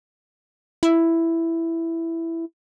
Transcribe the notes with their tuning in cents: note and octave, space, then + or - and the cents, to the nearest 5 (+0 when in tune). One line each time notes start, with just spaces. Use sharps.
E4 +5